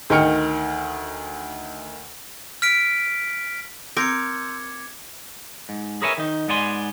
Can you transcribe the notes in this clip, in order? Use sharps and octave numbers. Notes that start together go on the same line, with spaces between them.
D2 D#3 D#4 G5 F6 C#7
F6 B6 D7
C4 A#4 C6 D6 E6 G6 G#6 C#7
G#2
G#4 A#4 B4 C#5 E5 G#5
D#3 D#4
G#2 B3 D5 G#5 C6